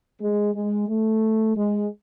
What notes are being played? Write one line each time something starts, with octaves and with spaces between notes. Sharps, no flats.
G#3
G#3
A3
G#3